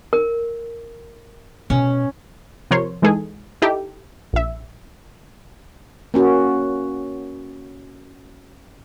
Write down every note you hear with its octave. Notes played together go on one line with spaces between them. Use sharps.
A#4
B2 C#4
C3 F3 A#4 C5 C#5 C6
E3 G#3 D#4 G#4 A4
D#4 E4 G4 A4
A#1 E5
A#3 C#4 F#4